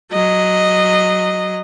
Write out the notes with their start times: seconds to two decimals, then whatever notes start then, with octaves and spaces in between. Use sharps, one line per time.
0.12 F#3 D#5